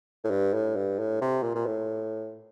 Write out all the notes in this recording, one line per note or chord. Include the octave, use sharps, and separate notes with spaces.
A2
G2
A2
G2
A2
C3
A#2
A#2
A2